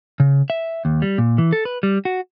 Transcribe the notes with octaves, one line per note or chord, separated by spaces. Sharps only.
C#3
E5
D#2
G3
A#2
E3
A4
B4
G3
F#4